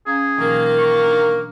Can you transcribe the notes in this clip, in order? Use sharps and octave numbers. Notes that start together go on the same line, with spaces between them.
C#4 G#4 F5 A#5
B2 D#3 E3 F#3 A#3
C#6
D4